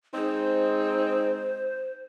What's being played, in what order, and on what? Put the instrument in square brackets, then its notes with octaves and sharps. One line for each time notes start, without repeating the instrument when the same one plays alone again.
[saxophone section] G#3 C4 D#4 [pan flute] C5